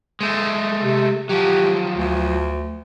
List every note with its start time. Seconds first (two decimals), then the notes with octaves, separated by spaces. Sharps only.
0.21 G#3 A3
0.81 C3
1.29 F3 F#3 G4
1.96 D2